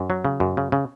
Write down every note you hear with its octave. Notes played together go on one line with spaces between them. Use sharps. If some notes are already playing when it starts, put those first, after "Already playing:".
Already playing: F#2
F#3
C#3
F#2
C#3
C#3